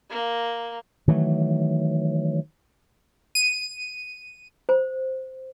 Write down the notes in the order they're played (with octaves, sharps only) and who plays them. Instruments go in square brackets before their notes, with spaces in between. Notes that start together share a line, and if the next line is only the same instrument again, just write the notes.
[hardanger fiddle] A#3
[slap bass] D#3 E3 F#3 A3
[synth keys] D#7
[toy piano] C5